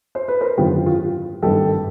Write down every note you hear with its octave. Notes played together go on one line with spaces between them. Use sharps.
C5
B4
A#4 C5
G#1 F#2 D3 F4 G4
F4 G4
G#1 G2 D#3 G4 A4